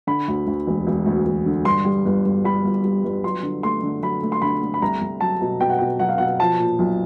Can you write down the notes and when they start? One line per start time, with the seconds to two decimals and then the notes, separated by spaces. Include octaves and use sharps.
0.07 D3 B5
0.28 D2
0.47 D2
0.67 E1
0.87 E1
1.06 D2
1.26 E1
1.46 D3
1.65 G2 C6
1.85 G3
2.06 G1
2.26 G2
2.44 G3 B5
2.64 G1
2.84 G3
3.04 G1
3.23 F#3 C6
3.43 D3
3.63 A3 C6
3.83 D3
4.02 F#3 B5
4.23 A3
4.32 C6
4.42 D3 B5
4.62 A3
4.74 B5
4.82 C2 A#5
5.01 C2
5.21 F#3 A5
5.41 B2
5.61 B2 G5
5.70 F#5
5.79 B2 G5
6.00 F#3 F#5
6.09 F5
6.18 B2 F#5
6.40 F3 A5
6.59 A#2
6.79 B1